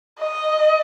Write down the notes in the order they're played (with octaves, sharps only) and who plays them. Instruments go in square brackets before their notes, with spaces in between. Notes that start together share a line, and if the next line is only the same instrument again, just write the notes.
[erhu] D#5